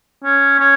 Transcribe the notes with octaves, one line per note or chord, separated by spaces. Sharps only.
C#4
C#4